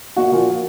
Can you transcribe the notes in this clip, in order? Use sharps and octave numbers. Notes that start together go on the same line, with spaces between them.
A#1 F#4
A#2 F3